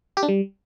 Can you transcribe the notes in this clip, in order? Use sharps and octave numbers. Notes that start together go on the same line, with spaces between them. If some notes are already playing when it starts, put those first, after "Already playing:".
G4
D4
G3